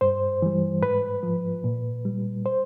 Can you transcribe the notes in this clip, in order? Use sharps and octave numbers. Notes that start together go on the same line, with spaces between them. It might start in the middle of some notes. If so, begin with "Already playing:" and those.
G2 C5
E3 G3
G#2 B4
F3
A#2
G3
C5